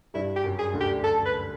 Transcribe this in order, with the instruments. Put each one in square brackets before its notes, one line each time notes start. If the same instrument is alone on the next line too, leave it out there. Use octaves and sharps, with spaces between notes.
[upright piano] G2 G3 [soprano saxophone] E4
[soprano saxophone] G4
[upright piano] F#2 F#3
[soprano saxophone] G#4
[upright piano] D2 D3
[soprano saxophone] G4
A4
B4